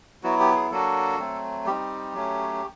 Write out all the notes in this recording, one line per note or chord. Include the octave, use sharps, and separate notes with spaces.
F#3 B3 E4 F#4
G4
G#4
F#3 A#3 D4 F#4 A4
F#3 A3 C4
G3 C4 D#4 G4
F#3 A3 C#4